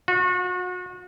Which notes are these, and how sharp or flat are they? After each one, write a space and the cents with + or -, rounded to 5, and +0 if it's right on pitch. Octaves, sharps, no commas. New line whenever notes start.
F#4 -35